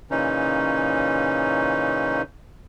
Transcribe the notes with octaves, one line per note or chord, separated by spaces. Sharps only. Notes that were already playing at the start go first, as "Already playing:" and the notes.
A#2 C#3 E3 C#4 D#4